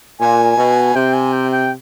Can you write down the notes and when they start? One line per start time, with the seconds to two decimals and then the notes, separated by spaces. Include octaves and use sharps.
0.20 A#2 G#5
0.58 B2
0.95 C3 G5
1.14 G#5
1.33 G5
1.52 G5